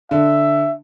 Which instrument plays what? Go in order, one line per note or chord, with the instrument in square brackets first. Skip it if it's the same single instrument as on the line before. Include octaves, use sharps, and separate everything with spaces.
[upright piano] D3 [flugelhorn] E5